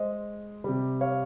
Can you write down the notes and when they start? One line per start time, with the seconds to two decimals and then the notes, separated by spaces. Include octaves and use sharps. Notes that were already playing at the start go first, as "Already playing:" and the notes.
Already playing: G#3 C5 D#5
0.64 C3 G3
1.01 C#5 F5